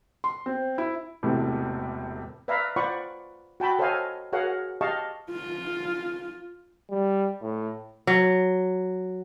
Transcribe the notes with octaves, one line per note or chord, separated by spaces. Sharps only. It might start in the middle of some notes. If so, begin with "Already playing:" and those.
C6
C4
E4
E1 E2 A2 C3
B4 D5 E5 F5 A#5 B5
F4 C5 D5 F#5 B5 C#6
F#4 G5 A5 B5
A4 C5 C#5 D#5 F5 G#5
F#4 G#4 A#4 C#5 F5 F#5
G4 D#5 F5 A5 C#6
F4
G3
A2
F#3